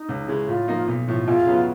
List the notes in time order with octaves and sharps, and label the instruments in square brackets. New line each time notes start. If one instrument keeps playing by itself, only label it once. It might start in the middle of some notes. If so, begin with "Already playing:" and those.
Already playing: [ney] D#4
[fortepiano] C#2
C#3 E3 G#3
[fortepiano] A2 [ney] F4
[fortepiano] F3 A#3 D#4
B1
A2 F3
[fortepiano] E2 [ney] F4
[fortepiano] C#3 F#3 B3